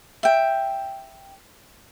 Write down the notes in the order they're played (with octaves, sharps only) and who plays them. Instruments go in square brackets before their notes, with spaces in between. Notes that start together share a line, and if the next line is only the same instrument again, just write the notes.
[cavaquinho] E5 G5